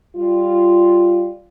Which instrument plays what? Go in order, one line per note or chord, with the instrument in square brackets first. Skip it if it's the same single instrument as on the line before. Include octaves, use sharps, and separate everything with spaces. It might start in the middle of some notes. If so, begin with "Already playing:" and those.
[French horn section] G3 F4